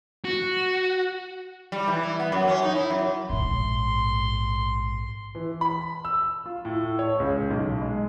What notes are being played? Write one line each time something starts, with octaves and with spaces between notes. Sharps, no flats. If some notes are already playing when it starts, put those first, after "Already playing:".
F#4
G3
E3
E4
B3
F#2
C#4
D#4
E4
F#2
A#1 G#2 C6
E3
B5
E6
F4
A2
C#5
C#2
B1
G#3